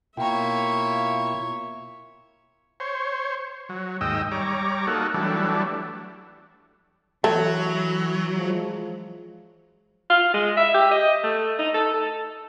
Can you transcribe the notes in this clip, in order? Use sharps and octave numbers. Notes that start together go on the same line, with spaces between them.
B2 A#3 E4 F4 C#5 E5 G5 A#5
C5 C#5
F#3
D#2 G#2 D#5 G5 E6
G3 C#5 A#5 D6
A#3 D#4 F#4 A4
E3 F#3 G3 A3 D4
E3 F#3 A3
F3 G#3
F4
G#3
E5
G4
D#5
A3
D#4
A4
A4